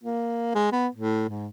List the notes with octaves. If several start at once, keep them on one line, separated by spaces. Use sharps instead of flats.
A#3
G#3
B3
A2
G#2